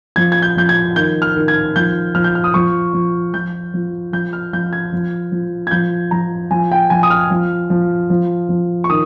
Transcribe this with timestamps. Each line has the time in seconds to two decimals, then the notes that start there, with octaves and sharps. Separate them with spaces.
0.16 F3 G#6
0.32 G#6
0.42 G6
0.56 F3 G6
0.69 G#6
0.96 D#3 G6
1.22 F6
1.36 D#3
1.48 G#6
1.76 F3 G6
2.15 F3 F6
2.24 G6
2.35 F6
2.44 D#6
2.54 F3 C#6
2.94 F3
3.34 F3 G6
3.74 F3
4.13 F3 G6
4.33 F6
4.53 F3 G6
4.73 G#6
4.92 F3
5.32 F3
5.67 G#6
5.71 F3 G6
6.11 F3 A#5
6.51 F3 G#5
6.72 G5
6.90 F3 G#5
7.03 D#6
7.10 F6
7.31 F3
7.70 F3
8.10 F3
8.49 F3
8.84 C#6
8.90 D#3 D#6